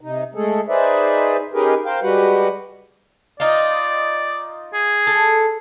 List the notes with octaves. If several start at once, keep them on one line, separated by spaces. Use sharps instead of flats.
C3 D#4
G#3 A3 G#4 A4
D#4 G#4 B4 C5 D5 E5
C#4 D#4 G4 G#4 A#4 B4
A#4 C5 F5 G5
G3 G#3 F#4 G4 B4 F#5
D#4 F4 D5
G#4
A4